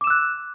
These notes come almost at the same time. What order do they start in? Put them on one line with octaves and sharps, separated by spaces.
D6 E7 E6 F#6